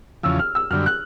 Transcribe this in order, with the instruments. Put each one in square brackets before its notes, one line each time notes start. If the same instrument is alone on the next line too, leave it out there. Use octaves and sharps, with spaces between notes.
[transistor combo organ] E2 C#3 F3 [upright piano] E6
[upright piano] F6
E6
[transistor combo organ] F#2 D3 G3 [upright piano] F6
[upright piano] F#6